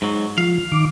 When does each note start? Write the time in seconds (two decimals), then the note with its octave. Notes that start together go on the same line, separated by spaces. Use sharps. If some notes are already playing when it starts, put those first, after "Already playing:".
0.02 G#2 F#3
0.38 F3 F5
0.72 D#3 D6